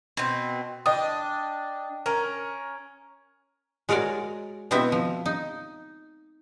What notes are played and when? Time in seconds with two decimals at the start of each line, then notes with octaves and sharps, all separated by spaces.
0.17 B2 C4
0.86 D4 D#5 G5 D#6
2.06 C#4 A#4
3.89 G#3 F#4 A#4 C#5 D5
4.71 B2 B3 C4 E4 E5
4.92 F3
5.26 D#4